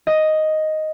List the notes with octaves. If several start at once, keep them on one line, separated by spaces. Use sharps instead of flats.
D#5